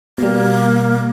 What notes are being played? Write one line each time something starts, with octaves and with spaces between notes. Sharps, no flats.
B2 G3 A#3